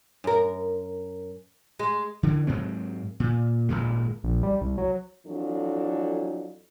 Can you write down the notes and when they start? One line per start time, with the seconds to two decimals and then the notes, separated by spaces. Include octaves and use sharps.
0.24 F#2 A#4
1.79 G#3
2.23 D3 E3
2.47 G#2 F#3 C4
3.20 A#2
3.69 G#1 C#2 A#2 G#3
4.24 A#1
4.43 G3
4.61 C2
4.78 F#3
5.26 F2 E3 F#3 D4 A4